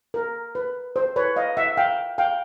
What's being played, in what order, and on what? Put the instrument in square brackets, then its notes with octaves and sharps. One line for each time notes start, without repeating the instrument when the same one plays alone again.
[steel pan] A#4
B4
C5
B4 C#5
D#5 F5
E5 F#5
F5 G5
F5 G5